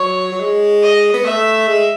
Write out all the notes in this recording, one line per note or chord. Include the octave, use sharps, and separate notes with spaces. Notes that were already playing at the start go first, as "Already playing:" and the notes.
Already playing: F#3 C#5
F#3
G#3
D#5
B3
A3 E5
G#3